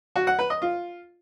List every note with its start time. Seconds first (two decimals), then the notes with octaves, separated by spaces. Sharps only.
0.16 F#4
0.27 F#5
0.39 B4
0.50 D#5
0.62 F4